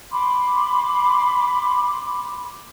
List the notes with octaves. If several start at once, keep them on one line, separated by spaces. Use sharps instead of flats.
B5 C6 D6